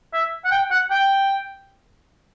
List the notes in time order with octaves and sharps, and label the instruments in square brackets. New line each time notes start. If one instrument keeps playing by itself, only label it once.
[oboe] E5
F#5
G5
F#5
G5